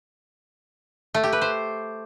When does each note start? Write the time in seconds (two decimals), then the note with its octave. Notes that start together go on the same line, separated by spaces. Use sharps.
1.15 A3
1.24 G4
1.33 B4
1.42 C5